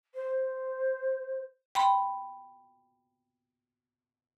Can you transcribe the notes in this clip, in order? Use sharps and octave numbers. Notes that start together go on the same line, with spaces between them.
C5
G5 B5 C6